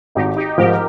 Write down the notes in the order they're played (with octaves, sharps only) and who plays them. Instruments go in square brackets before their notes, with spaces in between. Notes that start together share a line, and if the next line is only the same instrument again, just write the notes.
[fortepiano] G#1 [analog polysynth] D#4 G4
[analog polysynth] D#4 G4
[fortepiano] G#2 F3 [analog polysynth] G4 A#4